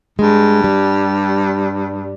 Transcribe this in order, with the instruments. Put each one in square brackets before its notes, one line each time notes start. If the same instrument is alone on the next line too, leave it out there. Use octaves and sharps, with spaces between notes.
[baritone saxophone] G2 [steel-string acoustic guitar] G#3
[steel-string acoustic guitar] G3